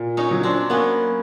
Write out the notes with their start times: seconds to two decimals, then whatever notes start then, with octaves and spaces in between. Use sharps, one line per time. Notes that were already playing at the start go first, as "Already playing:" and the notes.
Already playing: A#2
0.17 C#4 D#4
0.31 F#3
0.43 C4 D4
0.70 A#3 B3 C#4